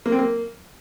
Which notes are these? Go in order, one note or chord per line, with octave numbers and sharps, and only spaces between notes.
A#3
C4
A#3